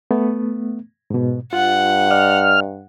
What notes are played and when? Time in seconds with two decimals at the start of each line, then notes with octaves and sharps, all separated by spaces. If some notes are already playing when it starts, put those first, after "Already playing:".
0.11 A3 B3
1.10 G#2 B2
1.53 G2 F4 F#5
2.11 D5 D#5 F6